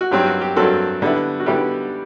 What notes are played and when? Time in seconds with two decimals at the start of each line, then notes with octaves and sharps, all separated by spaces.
0.01 F#4
0.11 G2 F#3 C4 G4
0.26 F#4
0.41 G4
0.56 G2 F#3 C4 F#4 A4
1.02 D3 G3 B3 E4
1.40 F#4
1.46 D3 G3 B3 E4 G4